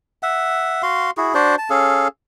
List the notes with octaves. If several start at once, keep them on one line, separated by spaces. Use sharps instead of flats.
E5 F#5
F#4 F5 C6
E4 F#4 G#4
D4 F#4 C5 D5
A5
C#4 G#4 A4 F5